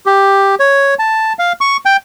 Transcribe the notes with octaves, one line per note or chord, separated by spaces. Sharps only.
G4
C#5
A5
F5
C#6
G5